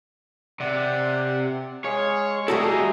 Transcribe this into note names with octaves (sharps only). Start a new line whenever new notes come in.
C3 D5 F#5
G#3 G#4 C#5 F5
G3 A3 E4 F#4 G#4 A4 D#5 A#5